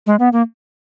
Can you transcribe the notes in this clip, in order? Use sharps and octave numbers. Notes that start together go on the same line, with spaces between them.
G#3
B3
A#3